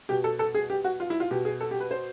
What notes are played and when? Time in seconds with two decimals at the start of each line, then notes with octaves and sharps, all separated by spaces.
0.09 B2 G4
0.24 A4
0.39 A4
0.54 G#4
0.70 G4
0.84 F#4
1.00 F4
1.10 E4
1.20 F4
1.31 B2 G4
1.45 G#4
1.61 A4
1.71 G4
1.80 B4
1.91 C5